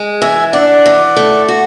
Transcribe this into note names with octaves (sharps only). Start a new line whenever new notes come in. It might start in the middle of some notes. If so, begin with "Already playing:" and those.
Already playing: G#3
E3 E5 G#5
D4 D5 F#5
E3
A3
F#4